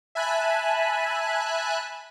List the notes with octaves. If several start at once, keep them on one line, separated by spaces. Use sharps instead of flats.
E5 G#5 A5 B5 F#6